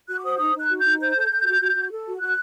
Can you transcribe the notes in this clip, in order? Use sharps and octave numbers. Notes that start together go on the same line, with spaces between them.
F#4 F#6
D6
C5 D#6
D#4 D#6
D#4
F#6
F#4
D#4 G6
C5 G6
A4
A4
F#4
F#4
F#4
A4
F#4
F#4 F#6